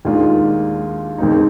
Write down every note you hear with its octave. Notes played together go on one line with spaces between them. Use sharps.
D#2 D#3 G#3 D4 F4
D#2 D#3 G#3 C4 D#4